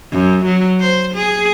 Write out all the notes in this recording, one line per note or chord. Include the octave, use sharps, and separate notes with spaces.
F#2
F#3
C5
G#4